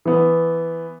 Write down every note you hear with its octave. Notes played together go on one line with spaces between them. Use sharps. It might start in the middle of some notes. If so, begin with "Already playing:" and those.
E3 B3